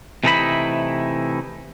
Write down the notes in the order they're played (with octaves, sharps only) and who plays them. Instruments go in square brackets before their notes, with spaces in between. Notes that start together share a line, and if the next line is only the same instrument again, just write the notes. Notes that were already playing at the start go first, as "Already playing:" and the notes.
[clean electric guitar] C3 E3 A3 D#4 E4 B5